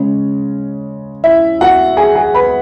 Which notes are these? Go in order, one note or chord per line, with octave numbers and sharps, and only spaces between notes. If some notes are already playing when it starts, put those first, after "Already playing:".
Already playing: C#3 G#3 C#4 C#5
E4 E5
F#4 F#5
G#4 G#5
G#4 G#5
B4 B5